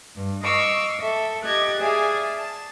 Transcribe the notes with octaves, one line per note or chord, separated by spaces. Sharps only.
G2
D#5 F5 C#6 D6 E6
A4 E5
G4 D#5 F#6 G#6 A6
G#4 D5 E5 F5 G#5 A5
A5